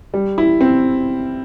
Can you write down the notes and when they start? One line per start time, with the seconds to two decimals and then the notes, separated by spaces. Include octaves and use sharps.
0.14 G3
0.38 E4
0.61 C4